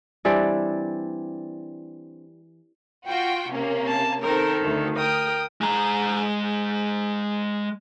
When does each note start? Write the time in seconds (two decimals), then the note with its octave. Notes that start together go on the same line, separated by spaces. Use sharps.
0.25 E3 G3 C4 D4
3.07 F4 F#4 G5
3.51 C3 A#3 C#4
3.87 A5
4.23 D#3 C4 A4 A#4
4.60 D2
4.97 A#4 G5 D#6
5.61 G#3 A#5